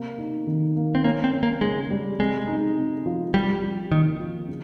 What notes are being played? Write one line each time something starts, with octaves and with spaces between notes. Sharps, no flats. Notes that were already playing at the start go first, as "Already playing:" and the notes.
Already playing: C3 A#3
D#4
D#3
A#3
C4
A#3 C#4
C4
C#4
A#3
C#3 G#3
G3
C3 G#3
D#4
C3
F3
F3 G3
F3
D#3 A#3
F3
C#3